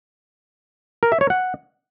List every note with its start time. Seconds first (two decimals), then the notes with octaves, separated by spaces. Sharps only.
1.03 A#4
1.12 E5
1.21 C#5
1.30 F#5